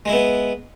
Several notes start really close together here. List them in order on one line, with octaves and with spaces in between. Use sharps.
G#3 E4 B3